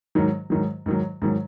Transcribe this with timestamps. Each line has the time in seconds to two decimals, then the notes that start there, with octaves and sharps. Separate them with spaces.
0.15 G#2 D#3 F#3
0.50 G#2 D#3 F#3
0.86 G#2 D#3 F#3
1.22 G#2 D#3 F#3